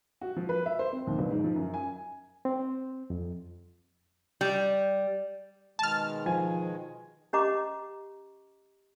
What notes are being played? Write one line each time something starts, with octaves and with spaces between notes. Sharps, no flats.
F#4
F3
B4
E5
C5
C4
D#2
G1
G#2
F3
F#2
G#5
C4
F2
G3
B2 D#3 G#3 A5 F6
F3 G#5
C#4 G4 D#5 A#5 D6